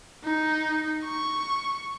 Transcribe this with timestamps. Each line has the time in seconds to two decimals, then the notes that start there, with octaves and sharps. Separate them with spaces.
0.25 D#4
1.04 C#6